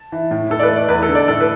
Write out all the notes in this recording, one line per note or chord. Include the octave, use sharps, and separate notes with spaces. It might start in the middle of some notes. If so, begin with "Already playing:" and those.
Already playing: A5
E3
A2
A2 A4
D5
B4
A3
D5
E2 B4
A4
D3
D5
A2 A4
B4